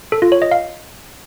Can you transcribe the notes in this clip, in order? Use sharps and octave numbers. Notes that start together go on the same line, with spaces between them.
A4
F4
C#5
D#5
F5